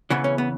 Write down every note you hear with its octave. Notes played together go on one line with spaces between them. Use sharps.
E2 C#3 E3 B3
C#4
B3